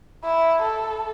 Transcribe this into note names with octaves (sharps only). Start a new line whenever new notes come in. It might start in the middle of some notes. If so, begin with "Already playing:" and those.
E4
A4